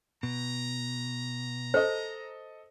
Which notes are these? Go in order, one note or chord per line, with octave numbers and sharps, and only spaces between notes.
B2 A#5
A4 C5 D#5